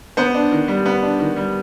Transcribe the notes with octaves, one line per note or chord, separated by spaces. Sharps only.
B3 C5
D4
D#3
G3
B3
D4
D#3
G3